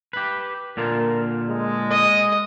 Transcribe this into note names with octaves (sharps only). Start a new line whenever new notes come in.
G4 B4
A#2 D3 F4 A#4
G#3
D#5